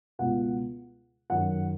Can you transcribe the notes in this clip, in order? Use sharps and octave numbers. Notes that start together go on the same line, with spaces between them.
C#2 B2 F#5
F#2 D#3 F#5